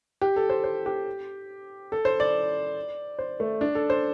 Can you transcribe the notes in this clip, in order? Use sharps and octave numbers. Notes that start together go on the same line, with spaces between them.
G4
A4
C5
C5
G4
A4
C5
D5
C5
A3
D4
A4
C5